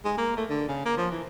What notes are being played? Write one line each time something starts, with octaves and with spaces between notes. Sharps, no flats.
G#3
A#3
A3
D3
C#3
A#3
F3
E3